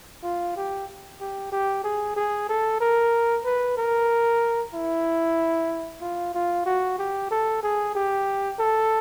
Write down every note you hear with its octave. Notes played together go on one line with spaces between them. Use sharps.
F4
G4
G4
G4
G#4
G#4
A4
A#4
B4
A#4
E4
F4
F4
F#4
G4
A4
G#4
G4
A4